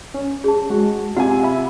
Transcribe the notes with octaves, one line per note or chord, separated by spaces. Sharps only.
C#4
G#4 A5
G#3 F#4
C3 F4 F#5 G#5
E5 B5